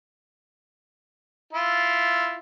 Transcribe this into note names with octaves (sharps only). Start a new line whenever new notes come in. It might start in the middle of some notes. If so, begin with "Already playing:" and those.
E4 F4